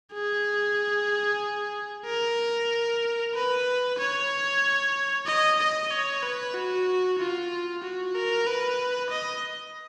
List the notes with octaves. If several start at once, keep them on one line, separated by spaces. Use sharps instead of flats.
G#4
A#4
B4
C#5
D#5
D#5
C#5
B4
F#4
F4
F#4
A#4
B4
D#5